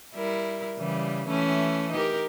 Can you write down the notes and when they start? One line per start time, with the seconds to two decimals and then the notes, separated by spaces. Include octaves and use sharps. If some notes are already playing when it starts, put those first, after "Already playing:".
0.15 G3 E4 A#4
0.79 C#3 E3 G3
1.28 E3 A3 C#4
1.93 D#4 G4 A#4